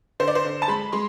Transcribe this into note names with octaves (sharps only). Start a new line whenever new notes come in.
D3 C5
D5
C5
D3
A5
G#3 B5
G#3 C6